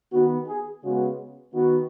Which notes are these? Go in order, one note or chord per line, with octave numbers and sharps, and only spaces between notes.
D#3 B3 F#4
G#4
C#3 G#3 B3 F#4
D#3 B3 F#4